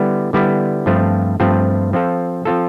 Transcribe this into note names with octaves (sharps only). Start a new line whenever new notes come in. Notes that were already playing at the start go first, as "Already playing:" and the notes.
Already playing: D3 G3 B3 E4
D3 G3 B3 E4
G2 F3 A3 C4 F4
G2 F3 A3 C4 F4
F3 C4 F4 A4
F3 C4 F4 A4